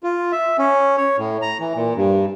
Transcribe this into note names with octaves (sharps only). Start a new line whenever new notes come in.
F4
E5
C#4
C#5
A2
A#5
E3
A#2
G2